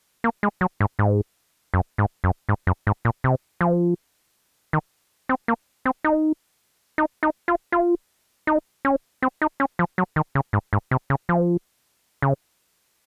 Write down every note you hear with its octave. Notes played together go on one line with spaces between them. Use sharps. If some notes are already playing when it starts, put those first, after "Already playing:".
A#3
G#3
F#3
G#2
G#2
F#2
G#2
F#2
G#2
F#2
G#2
A#2
C3
F3
D#3
C4
A#3
C4
D#4
D#4
D#4
F4
F4
D#4
C#4
C4
D#4
C#4
F3
F#3
D#3
C#3
G#2
G#2
C3
C#3
F3
C#3